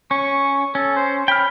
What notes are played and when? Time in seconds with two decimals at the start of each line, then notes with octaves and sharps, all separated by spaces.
0.11 C#4 C#6
0.75 C#4 A4
0.96 C5
1.28 G5 B5 F6